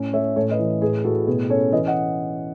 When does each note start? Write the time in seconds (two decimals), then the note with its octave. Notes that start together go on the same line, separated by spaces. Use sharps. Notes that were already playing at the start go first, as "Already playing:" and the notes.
Already playing: A2 C#4
0.13 A3 C#5 E5
0.36 A2 A4 C#5
0.51 B4 D#5
0.59 E3
0.81 A2 G#4 B4
1.04 A2 F#4 A4
1.27 B2 G#4 B4
1.49 C#4 A4 C#5
1.72 E3 B4 D#5
1.87 D#5 F#5